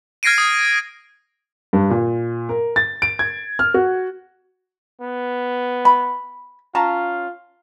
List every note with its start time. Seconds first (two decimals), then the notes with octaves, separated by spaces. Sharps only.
0.23 F6 G#6 A#6 C7 D7 D#7
0.38 D#6
1.73 G2
1.90 A#2
2.49 A#4
2.76 A6
3.02 D7
3.19 G#6
3.59 F6
3.74 F#4
5.02 B3
5.85 B5
6.75 C#4 F4 A5 A#5